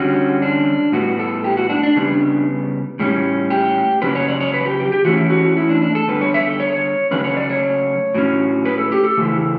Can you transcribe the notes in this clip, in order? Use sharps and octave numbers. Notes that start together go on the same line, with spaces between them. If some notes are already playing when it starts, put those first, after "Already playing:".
Already playing: D3 G3 C#4 F#4
D4
A2 G3 B3 F#4
A4
G4
F#4
D4
D4
C#3 G3 B3 D4
A2 G3 C#4
G4
C#3 F#3 C#4 B4
C#5
D5
C#5
B4
G4
G4
G4
E3 A3 C#4 F#4
E4
F#4
E4
D4
D4
A4
D3 G3 B3 B4
C#5
E5
A4
C#5
C#3 F#3 A3 C#4 B4
C#5
D5
C#5
A2 F#3 C#4
B4
A4
G4
A4
C#3 E3 A3